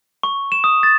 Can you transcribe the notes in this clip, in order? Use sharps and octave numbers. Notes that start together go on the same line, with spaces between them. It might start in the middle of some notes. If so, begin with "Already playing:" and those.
C#6
E7
D#6
A6